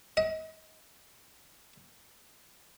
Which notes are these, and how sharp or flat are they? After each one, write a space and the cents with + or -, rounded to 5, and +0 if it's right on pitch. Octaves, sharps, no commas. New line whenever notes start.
D#5 +35